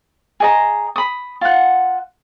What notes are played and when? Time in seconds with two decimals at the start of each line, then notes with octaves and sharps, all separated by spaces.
0.40 G#4 D#5 A#5
0.96 B5 D#6
1.41 F4 F#5